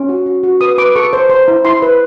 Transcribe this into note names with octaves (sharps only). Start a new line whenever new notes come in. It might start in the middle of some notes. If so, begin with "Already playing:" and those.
Already playing: C#4
F#4
F#4
F#4
B4 D#6
B4 D6
A4 C#6
C5
C5
E4
E4 C6
B4